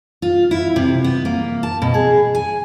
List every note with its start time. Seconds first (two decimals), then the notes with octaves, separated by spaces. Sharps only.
0.22 F4
0.51 E4
0.76 C3
1.04 B3
1.25 A#3
1.63 A5
1.82 B2
1.94 G#4
2.35 G#5